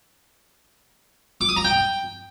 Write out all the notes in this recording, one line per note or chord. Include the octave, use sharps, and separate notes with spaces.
D6
D#6
A#5
G5